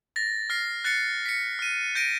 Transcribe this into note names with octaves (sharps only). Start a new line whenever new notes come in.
A6 A#6
F6 A#6 C7
F#6 A6 C7 C#7
B6 C#7
F6 D#7
G6 A#6 D7 D#7